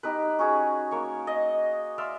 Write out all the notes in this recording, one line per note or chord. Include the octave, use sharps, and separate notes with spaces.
D#4 G4 B4
C#4 F#4 G#4
A#3 C#5 C#6
D#5
D5 E5 F5 C6